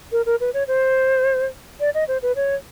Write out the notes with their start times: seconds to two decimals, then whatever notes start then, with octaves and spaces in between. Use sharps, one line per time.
0.12 A#4
0.26 A#4
0.40 B4
0.54 C#5
0.68 C5
1.80 D5
1.94 D#5
2.08 C5
2.22 B4
2.36 C#5